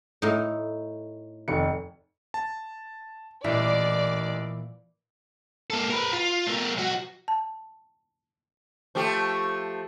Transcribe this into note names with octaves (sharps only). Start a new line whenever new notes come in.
A2 D#4
F1 D#3 C#7
A5
A1 A#2 E3 E4 D5 D6
A#3 A4
A#4 B4
F4
A3 A#4
B1 F#4
A5
F3 A3 G4